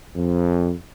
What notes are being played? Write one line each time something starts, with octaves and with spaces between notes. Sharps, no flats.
F2